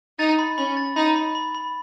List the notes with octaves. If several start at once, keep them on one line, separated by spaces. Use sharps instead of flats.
D#4 A6
B5
C#4 B5
A6
D#4 B5
B5
B5
B5